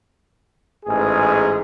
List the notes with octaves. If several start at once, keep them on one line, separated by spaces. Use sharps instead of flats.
A1 G#2 G#4